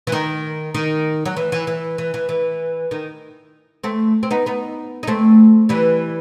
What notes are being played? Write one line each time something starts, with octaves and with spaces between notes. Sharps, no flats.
E3
D#3
D#3
F#3
E3
E3
E3
E3
E3
E3
D#3
A3 C4
C4
B3 D#4
B3 D#4
D#4
A3 C4
E3 G3